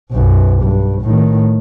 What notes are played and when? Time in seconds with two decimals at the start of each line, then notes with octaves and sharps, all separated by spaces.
0.12 B1 F#2
0.62 G2
1.02 A2 D#3